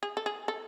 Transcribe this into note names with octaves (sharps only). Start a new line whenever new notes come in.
G#4
A4
G#4
A4